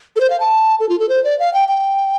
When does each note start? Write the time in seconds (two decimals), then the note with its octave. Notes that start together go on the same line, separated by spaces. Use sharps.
0.16 A4
0.20 C5
0.30 F5
0.40 A5
0.80 A4
0.89 F4
1.00 A4
1.09 C5
1.24 D5
1.39 F5
1.54 G5
1.68 G5